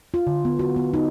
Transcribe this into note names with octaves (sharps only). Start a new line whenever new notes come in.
F4
D3
B3
F#4
B3
D#4